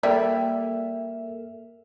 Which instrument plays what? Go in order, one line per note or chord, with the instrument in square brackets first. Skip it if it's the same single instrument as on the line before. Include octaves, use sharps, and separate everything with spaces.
[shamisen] G3 [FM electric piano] A#3 A4 A#4 [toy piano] D5 [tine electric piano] E5